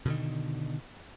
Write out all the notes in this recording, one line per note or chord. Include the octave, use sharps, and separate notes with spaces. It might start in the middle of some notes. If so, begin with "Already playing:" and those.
B2 D3 D#3